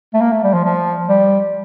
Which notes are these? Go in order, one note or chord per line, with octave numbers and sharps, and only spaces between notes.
A3
A#3
A3
G3
F3
F3
G3